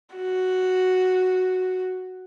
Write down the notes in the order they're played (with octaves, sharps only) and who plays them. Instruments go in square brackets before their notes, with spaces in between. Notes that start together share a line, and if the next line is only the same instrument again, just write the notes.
[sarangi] F#4